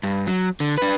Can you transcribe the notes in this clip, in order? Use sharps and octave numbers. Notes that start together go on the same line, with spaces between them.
G2
F#3
D3
D4 B4